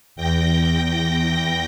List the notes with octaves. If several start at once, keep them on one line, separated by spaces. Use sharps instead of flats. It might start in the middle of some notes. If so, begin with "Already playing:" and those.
E2 G5 G6 A#6